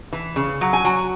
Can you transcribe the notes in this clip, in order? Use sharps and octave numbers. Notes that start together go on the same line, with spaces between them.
E3
C#3
F#3
G#5
F#3